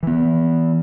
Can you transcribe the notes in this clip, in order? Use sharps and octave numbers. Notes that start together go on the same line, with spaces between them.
E3 B3